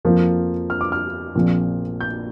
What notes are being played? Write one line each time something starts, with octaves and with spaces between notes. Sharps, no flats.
F2 F3 A#3 F4
F6
D6
F6
A#1 A#2 F3 C4
G6